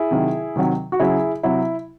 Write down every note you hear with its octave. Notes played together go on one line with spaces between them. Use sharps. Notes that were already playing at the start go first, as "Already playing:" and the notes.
Already playing: E4 G#4
C3 D#3 F#3
C3 D#3 F#3
F#4
C#3 F#3 E4 G#4
C3 F#3 E4